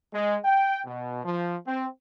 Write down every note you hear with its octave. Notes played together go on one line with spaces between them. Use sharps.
G#3
G5
B2
F3
C4